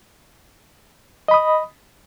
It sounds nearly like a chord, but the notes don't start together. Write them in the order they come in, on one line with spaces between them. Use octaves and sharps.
D#5 B5 D#6